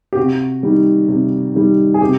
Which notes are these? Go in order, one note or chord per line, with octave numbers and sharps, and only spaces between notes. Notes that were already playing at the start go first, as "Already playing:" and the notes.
G4
C3 F#4
D#3 G3
C3
D#3 G3
G#4
C3 G4